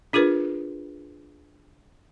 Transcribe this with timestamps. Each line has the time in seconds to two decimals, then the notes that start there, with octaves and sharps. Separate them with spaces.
0.13 D4 F4 G#4 A#4 B4